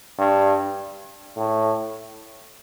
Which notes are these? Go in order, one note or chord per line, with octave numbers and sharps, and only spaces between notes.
G2
A2